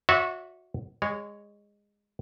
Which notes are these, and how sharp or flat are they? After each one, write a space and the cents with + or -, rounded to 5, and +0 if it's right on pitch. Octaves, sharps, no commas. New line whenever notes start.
F#4 -25 C#5 +45 E5 -15
G#3 -20 C#5 +0